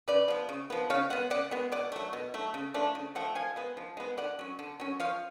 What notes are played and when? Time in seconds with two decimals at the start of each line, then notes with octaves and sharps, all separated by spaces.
0.08 C#3 B4 D5
0.28 F3 B3
0.49 C#3
0.70 F3 B3
0.90 C#3 C#5 F5
1.10 G#3 B3 F#5
1.30 C#3 D5 F#5
1.51 G#3 B3
1.72 B2 D5 F#5
1.92 F#3 A3
2.13 B2
2.34 F#3 A3
2.54 C#3
2.74 F3 A3 D4
2.95 C#3
3.15 F3 A3 F#5
3.35 F3 F5 G#5
3.56 G#3 B3
3.77 F3
3.97 G#3 B3
4.17 D3 D5 F#5
4.39 F#3 C#4
4.59 D3
4.80 F#3 C#4
5.00 F3 C#5 F5